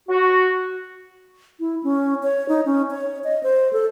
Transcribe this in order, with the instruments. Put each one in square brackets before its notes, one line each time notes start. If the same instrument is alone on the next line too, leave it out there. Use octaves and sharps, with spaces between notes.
[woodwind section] F#4
[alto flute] E4
C#4
C#5
D#4
C#4
C#5
D#5
C5
A4